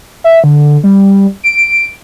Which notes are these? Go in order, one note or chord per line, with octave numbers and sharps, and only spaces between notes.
E5
D3
G3
D7